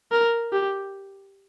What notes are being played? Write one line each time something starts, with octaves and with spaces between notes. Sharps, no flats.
A#4
G4